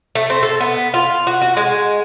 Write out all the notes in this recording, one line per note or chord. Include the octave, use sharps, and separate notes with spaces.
A3
C4
A4
B3
F4
F#4
F#4
G#3